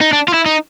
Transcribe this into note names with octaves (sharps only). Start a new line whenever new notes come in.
D#4
D4
F4
E4
D#4